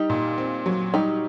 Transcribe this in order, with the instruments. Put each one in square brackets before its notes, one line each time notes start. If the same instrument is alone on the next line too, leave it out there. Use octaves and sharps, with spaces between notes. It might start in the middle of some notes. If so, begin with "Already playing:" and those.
Already playing: [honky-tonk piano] G3 [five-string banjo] D#4 G4
[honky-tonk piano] A#2
C4
F#3
[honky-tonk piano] G3 [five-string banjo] D#4 G4